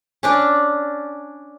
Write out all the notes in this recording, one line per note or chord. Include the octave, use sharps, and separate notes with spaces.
C#4 D4 D5